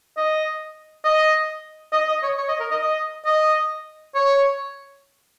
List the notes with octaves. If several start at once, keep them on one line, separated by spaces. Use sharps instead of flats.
D#5
D#5
D#5
D#5
C#5
C#5
D#5
A#4
D#5
D#5
D#5
C#5